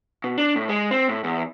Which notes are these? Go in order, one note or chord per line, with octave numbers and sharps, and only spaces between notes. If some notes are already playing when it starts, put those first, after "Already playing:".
B2
D4
A2
G#3
C4
A2
E2